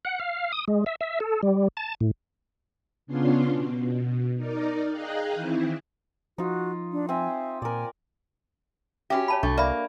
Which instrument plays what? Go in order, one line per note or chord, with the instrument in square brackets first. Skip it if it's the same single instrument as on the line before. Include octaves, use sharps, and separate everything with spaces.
[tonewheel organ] F#5
F5
D#6
G#3
E5
E5
A4
G3
A5
A2
[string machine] C#3 B3 C#4 D4 F4 C6
B2
D#4 A#4 D5
G#4 D#5 F5 G5 A#5 F#6
D#3 E3 C4 E4
[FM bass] F3 [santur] D#4 F4 [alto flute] F#4
[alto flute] D4
[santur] C4 G#5 [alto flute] E5
[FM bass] A#2 [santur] A#4 D5 [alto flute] G#5
[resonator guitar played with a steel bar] C#4 G4 [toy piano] F#4 E5
[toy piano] C#5 A5 B5
[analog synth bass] C2 [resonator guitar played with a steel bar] A3 [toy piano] D4 C#6
[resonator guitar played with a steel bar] A#3 [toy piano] D5 E5 B5